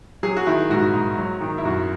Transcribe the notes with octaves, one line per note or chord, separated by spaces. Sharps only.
F#3 G#4
F#4
D#3 E4
G#2 F#4
G#2
F#3
D#3
E4
F#2 F#4